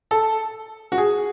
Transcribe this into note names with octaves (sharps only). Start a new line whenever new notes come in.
A4
F#4
G#4